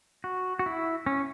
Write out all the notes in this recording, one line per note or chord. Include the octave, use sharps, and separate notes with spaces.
F#4
F#4
E4
C#4